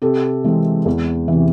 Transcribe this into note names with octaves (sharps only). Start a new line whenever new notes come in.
C3 G4 A4
E3 G#3 C4
E2
C3 E3